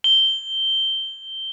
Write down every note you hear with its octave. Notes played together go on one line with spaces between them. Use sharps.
G7